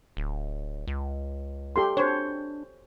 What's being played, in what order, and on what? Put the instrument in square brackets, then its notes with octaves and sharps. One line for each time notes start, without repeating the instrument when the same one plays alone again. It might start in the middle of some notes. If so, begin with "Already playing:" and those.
[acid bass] D1
C#2
[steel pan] G4 A4 C6
[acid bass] D4 [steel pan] C5 C#5